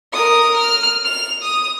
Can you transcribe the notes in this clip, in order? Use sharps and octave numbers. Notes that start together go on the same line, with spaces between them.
A#4 D#6
F6
F7
D#6